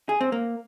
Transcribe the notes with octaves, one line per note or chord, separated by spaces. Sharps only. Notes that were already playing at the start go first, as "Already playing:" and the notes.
G#4
C4
A#3